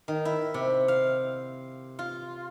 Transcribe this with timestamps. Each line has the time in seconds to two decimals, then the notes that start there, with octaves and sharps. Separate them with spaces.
0.08 D#3
0.25 E4
0.54 C3
0.88 F5
1.99 F4